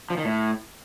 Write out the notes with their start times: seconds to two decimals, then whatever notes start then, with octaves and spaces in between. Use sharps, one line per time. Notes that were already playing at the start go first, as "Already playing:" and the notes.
0.10 F3
0.18 D#3
0.25 A2